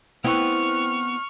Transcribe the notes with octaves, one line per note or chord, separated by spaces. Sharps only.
B3 C4 E4 C#6 F6